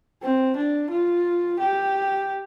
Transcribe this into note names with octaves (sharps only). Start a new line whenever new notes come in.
C4
D4
F4
G4